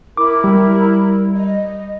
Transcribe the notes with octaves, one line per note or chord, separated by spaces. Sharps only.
E4 A#4 B5 D6
G3
D#5